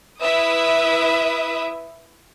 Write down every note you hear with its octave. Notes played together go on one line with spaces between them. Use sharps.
E4 B4 E5 D#6